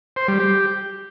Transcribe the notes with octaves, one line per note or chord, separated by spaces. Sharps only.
C5
G3
G4